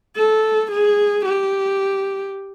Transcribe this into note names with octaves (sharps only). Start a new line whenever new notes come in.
A4
G#4
G4